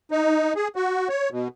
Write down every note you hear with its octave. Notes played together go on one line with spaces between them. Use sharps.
D#4
G#4
F#4
C#5
B2